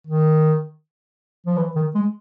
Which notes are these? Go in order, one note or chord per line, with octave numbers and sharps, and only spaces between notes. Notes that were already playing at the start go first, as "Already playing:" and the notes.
D#3
F3
E3
D#3
G#3